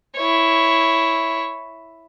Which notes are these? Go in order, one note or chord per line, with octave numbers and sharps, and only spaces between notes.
E4 C#5